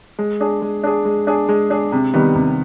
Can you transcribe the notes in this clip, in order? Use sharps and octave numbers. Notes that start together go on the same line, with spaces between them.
G#3
D4 G#4
G#3
D4 G#4
G#3
D4 G#4
G#3
D4 G#4
C3
D#3 G3 B3
C3